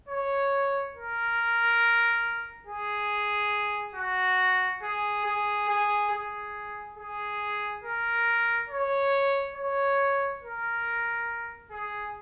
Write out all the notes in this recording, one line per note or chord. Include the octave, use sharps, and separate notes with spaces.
C#5
A#4
G#4
F#4
G#4
G#4
G#4
G#4
G#4
A#4
C#5
C#5
A#4
G#4